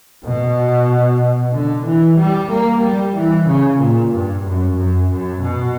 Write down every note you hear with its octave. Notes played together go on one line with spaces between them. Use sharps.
B2
D3
E3
G3
A#3
G3
E3
C#3
A#2
G2
F#2
F#2
F#2
B2